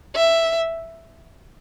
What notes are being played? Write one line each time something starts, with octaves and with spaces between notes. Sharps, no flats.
E5